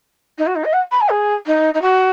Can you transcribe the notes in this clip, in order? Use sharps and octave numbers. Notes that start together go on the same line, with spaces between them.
D#4
F#4
D#4
D#5
F#5
B5
G#5
G#4
D#4
D#4
F#4